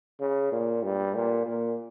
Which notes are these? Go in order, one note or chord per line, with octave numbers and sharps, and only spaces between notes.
C#3
A#2
G2
A#2
A#2